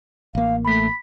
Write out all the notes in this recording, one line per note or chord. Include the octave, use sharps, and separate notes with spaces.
A1 A#3 F5
A3 B5 B6